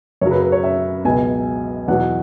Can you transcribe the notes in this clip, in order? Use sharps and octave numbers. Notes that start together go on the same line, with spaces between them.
F#2 C#3 F#3 C#5
B4
B4
C#5
E5
C#2 B2 F#3 G#5
E2 B2 F#3 F#5